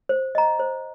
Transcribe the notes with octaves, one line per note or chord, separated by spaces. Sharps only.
C5
D#5 A#5
C5